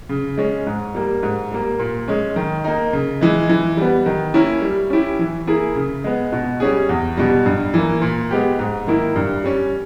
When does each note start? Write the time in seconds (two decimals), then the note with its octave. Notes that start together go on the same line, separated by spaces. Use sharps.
0.09 C#3
0.37 G#3 C#4
0.66 G#2
0.95 G3 A#3
1.23 G#2
1.51 G3 A#3
1.79 A#2
2.08 G#3 C#4
2.36 D#3
2.64 A#3 D#4
2.93 C#3
3.21 E3 G#3
3.49 E3
3.77 G3 B3
4.06 D#3
4.34 A#3 C#4 E4 A#4
4.62 G3
4.90 C#4 E4 G4
5.19 E3
5.47 A#3 E4 G#4
5.76 C#3
6.04 G#3 B3
6.32 B2
6.60 G3 C#4 G#4
6.89 E2
7.17 B2 G3
7.46 G2
7.74 E3 A#3
8.02 A#2
8.31 G#3 B3 G4
8.59 G#2
8.87 D#3 A#3 E4
9.16 G2
9.44 G3 C#4